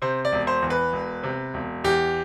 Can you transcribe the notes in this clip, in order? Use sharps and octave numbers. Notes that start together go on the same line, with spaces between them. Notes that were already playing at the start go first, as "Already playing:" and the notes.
C3 C5
D5
E1
C5
E2
B4
E1
C3
E1
E2 G4